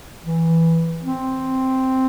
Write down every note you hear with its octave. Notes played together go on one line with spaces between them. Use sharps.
E3
C4